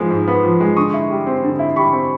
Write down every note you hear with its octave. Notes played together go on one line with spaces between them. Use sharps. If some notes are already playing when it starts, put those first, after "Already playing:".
Already playing: G#2 F3 G#3 B3
G#2
B3
F3
G#3
D3 C#6 D#6
E4
G3
C4
D3
E4
G3 B5 C#6
C4